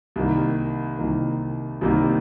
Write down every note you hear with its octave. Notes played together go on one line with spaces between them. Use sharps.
C2 C3 D#3 A#3
C2 C3 D#3 A#3
C2 C3 D#3 A#3